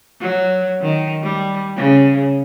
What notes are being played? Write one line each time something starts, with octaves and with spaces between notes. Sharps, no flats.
F#3
D#3
G3
C#3